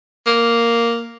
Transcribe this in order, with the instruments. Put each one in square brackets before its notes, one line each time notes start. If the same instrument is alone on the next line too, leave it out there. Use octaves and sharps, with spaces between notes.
[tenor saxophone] A#3